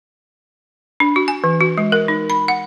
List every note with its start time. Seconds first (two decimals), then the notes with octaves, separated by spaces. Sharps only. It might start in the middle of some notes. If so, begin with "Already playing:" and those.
1.00 D4
1.16 F#4
1.28 G#5
1.44 E3
1.60 F#4
1.78 G#3
1.92 A#4
2.08 D#4
2.30 B5
2.48 F#5